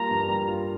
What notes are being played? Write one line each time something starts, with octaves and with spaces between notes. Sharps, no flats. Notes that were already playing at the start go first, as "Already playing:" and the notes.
Already playing: G3 A#3 F4 A#5
G2
G3
F4